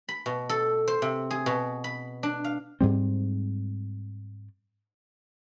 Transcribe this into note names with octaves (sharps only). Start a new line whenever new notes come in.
B5
B2
A4
C5
C3
G#4
B2
B5
D4
F5
G#2 G3 C4